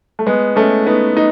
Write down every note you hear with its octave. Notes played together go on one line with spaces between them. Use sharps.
A3
G#3 B3
A3 C#4
B3 D#4
D#4